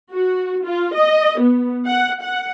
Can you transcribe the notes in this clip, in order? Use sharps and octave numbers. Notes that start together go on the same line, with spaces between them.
F#4
F4
D#5
B3
F#5
F#5